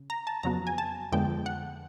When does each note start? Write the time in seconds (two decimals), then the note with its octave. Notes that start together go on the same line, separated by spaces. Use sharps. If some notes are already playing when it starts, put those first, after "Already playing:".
Already playing: C#3
0.10 A#5
0.27 A5
0.43 F2 C#3 F#3 B3 A#5
0.67 G#5
0.78 A5
1.12 F2 D3 F3 G#3 B3 G5
1.46 F#5